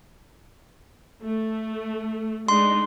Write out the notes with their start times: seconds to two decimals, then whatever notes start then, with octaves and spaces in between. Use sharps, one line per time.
1.23 A3
2.48 G#3 D4 D#4 C6